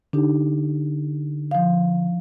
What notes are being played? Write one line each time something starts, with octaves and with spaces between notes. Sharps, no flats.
D3 D4 D#4 G4
F3 F5